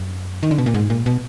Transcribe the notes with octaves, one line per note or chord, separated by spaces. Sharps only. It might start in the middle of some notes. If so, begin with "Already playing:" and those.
Already playing: F#2
D#3
D3
B2
A#2
G#2
A#2
B2